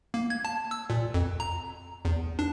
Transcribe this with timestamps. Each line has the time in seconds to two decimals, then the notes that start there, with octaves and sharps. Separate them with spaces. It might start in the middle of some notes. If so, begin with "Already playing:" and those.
0.14 A#3
0.30 G#6
0.45 A5
0.71 E6
0.90 A#2
1.14 F2
1.40 A#5
2.05 E2
2.39 D4